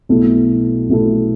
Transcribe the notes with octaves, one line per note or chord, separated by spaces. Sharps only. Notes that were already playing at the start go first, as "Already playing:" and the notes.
B1 B2 A3 E4 A4
B1 B2 A3 E4 A4